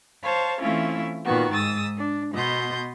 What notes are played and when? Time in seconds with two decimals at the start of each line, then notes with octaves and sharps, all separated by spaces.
0.24 C5 C#5 F5 A5
0.62 E3 A3 C4 C#4 E4 F4
1.25 A#2 D#3 B3 F#4
1.54 G#2 D#6 E6 A6
1.98 D4
2.34 B2 B3 D#5 C6 G6